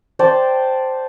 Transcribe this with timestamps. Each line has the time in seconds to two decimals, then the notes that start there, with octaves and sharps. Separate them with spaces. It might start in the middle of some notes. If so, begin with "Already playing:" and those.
0.19 C5 D5 G5 A5